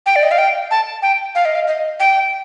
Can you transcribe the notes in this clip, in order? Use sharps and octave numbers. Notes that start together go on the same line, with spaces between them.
G5
D5
D#5
F5
G5
A5
G5
F5
D#5
F5
D#5
G5